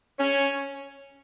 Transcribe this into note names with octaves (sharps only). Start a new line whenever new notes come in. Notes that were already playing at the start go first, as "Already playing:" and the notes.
C#4